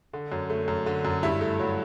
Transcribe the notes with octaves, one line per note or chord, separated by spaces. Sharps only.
D3
F#2
A3
F#2
D3
F#2
G2 E4
A3
F#3